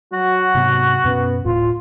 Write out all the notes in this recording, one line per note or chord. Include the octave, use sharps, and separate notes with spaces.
F#3 F#4
G#2 C3 B3
F#2 B2 B3 C#4
D1 A2 F4